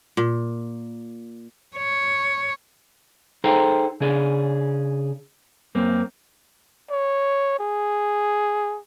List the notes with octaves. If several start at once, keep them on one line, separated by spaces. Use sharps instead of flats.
A#2
C#5
D#4 G#4 A4 C5 G5 A#5
C#3 D4 G#4 D5
F#2 A#3 C4
C#5
G#4